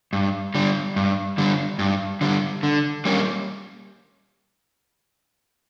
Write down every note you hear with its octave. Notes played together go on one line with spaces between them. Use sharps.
G2
D3 G3
G2
D3 G3
G2
D3 G3
D3
G3 A#3 C#4